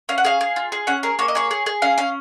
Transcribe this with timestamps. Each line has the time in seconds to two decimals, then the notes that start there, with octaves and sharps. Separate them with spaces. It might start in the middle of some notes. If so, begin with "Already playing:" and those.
0.09 C#4 F5
0.18 F#5
0.24 G#4 F5
0.41 G#4
0.56 F4
0.72 G#4
0.87 C#4 F#5
1.03 G#4 A#4
1.19 A#3 C#5
1.28 D#5
1.35 G#4 C#5
1.51 G#4
1.66 G#4
1.82 C#4 F5
1.98 C#4 F5